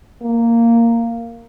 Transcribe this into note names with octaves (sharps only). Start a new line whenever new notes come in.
A#3